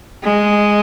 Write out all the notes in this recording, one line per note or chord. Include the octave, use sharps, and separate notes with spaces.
G#3